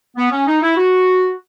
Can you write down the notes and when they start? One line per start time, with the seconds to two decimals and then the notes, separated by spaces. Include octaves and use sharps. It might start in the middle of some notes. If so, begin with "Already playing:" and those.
0.17 B3
0.31 C#4
0.47 D#4
0.62 E4
0.77 F#4